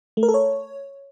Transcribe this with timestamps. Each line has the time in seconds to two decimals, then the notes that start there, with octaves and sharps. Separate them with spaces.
0.17 A3
0.23 A#4
0.28 A4
0.34 C#5